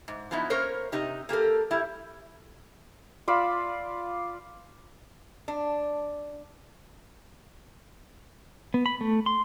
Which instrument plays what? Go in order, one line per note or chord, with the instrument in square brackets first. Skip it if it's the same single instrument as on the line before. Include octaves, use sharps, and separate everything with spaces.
[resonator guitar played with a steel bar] G#2
F3 F#3 B3 D#4 E4
A#3 C#4 A#4 C5 C#5
C3 D#4 G4
A#3 G4 A4 A#4
G3 E4
[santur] F4 D5 B5 E6
[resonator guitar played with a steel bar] D4
[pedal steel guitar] B3
B5
A3
C6